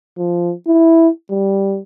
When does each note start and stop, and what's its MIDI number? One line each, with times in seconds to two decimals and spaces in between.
0.18 0.53 53
0.67 1.09 64
1.30 1.79 55